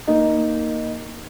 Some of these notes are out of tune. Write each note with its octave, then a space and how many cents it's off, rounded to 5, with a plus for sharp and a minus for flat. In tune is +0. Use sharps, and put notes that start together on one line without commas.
A#3 +0 D#4 +0